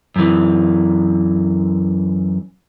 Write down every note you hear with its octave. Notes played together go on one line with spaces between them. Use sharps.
F#2 E3